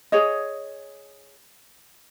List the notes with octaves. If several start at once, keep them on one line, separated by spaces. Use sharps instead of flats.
G#4 C#5 D#5